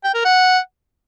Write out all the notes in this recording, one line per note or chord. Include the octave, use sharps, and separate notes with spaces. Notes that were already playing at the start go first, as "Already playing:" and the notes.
G5
A#4
F#5